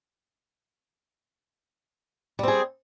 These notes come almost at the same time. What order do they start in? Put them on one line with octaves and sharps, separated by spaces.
G3 C4 G#4